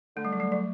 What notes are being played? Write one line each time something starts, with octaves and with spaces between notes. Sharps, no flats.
D3 A3
G3
F#3
G3 A3
F#3